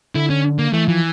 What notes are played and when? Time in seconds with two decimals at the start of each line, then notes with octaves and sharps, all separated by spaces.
0.15 D3 E4
0.30 C#4
0.59 A#3
0.73 E3 A3
0.87 E3 F3